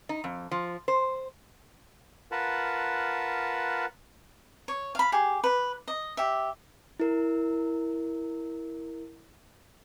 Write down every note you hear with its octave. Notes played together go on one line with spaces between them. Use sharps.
D#4
F2
F3
C5
F4 A#4 B4 F#5 A5
C#5
F5 B5
G4 G#4
B4
D#5
G4 E5
E4 A#4